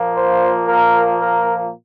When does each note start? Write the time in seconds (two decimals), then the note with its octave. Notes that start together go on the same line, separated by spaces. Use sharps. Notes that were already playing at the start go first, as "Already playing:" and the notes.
Already playing: A#2 F3 A#3
0.16 C5
0.68 A#4
1.19 A#4